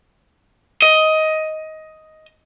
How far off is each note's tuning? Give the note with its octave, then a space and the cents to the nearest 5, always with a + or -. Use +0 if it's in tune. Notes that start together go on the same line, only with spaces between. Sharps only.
D#5 +10